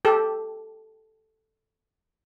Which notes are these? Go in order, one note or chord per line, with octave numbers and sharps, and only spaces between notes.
G4 A4